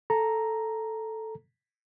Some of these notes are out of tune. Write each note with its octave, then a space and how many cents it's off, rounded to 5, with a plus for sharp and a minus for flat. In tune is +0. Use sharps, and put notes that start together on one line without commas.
A4 +0 A#5 +0